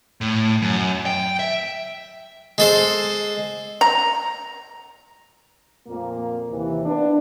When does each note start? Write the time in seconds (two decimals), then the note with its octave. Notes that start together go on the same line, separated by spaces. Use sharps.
0.21 A2
0.62 F#2
1.06 G5
1.39 E5
2.58 G#3 A4 C5
3.81 A#5
5.88 F2 A#2 A#3
6.50 D#2 C3 E3
6.85 A#3 B3 D4